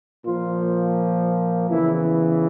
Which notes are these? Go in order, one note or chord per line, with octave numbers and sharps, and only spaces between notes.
A#2 F3 A#3 F4
E2 C#3 E3 E4